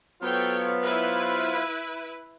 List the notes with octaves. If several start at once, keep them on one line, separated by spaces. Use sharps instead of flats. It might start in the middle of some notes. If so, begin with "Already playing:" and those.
F#3 B3 F4 A4 C5 C#5 F5 G5
E4 B4